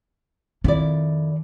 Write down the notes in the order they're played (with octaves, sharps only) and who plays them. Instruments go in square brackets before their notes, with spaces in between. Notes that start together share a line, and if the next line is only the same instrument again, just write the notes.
[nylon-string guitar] F2 E4 D5 [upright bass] D#3